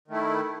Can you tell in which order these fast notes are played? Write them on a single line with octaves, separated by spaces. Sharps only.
D#3 A3 E4